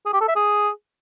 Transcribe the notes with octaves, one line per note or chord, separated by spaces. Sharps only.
G#4
G4
A4
E5
G#4